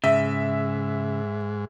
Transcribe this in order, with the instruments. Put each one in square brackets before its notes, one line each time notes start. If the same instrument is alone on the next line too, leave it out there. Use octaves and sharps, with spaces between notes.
[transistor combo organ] G#2 [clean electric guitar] C#3 [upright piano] E5